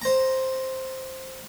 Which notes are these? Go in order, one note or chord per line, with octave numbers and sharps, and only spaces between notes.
C5 A#5